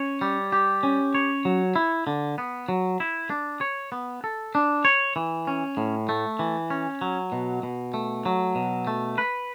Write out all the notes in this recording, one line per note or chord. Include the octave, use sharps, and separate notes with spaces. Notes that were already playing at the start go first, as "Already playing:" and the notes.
Already playing: C#4 C#5
G3
G4
C#4
C#5
F#3
E4
D3
B3
F#3
E4
D4
C#5
B3
A4
D4
C#5
E3
C#4
A2
A3
E3
C#4
F#3
B2
B2
A3
F#3
B2
A3
B4